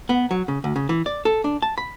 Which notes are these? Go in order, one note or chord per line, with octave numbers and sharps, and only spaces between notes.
B3
F#3
C#3
D2
C#3
E3
D5
A4
D4
A5
B5